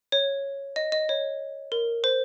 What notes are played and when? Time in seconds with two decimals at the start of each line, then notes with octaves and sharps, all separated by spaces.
0.12 C#5
0.76 D#5
0.92 D#5
1.09 C#5
1.72 A#4
2.04 C5